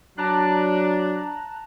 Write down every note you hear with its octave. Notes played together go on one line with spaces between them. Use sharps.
F#3 D4 A5 A#5 F#6